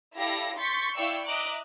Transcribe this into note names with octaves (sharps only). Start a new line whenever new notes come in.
E4 G4 A4 D5 F5 A#6
C6 C#6 G6 A6 B6 C#7
E4 D5 F5 G5 C#6 E6
D#5 E5 A#5 D6 F#6 D7